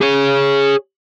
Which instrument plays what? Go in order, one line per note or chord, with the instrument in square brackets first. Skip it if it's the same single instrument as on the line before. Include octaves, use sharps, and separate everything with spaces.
[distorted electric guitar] G#4 C#5